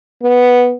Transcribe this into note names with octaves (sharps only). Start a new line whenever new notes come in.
B3